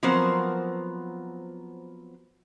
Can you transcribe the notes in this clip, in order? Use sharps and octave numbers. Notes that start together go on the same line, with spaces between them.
F3 F#3 B3 C4 A#4 C5